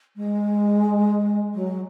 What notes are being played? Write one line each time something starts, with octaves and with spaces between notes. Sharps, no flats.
G#3
F#3